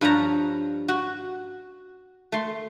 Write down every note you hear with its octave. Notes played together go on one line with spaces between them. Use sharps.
G2 F3 G3 C#5 A#5
F#4
A3 C6